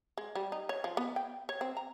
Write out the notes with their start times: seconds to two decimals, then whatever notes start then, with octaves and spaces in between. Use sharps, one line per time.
0.18 G#3
0.35 G3
0.52 D#4
0.69 C#5
0.84 F3
0.97 B3
1.16 G5
1.49 C#5
1.61 C4
1.77 A#5